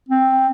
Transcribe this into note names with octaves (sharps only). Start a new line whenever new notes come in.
C4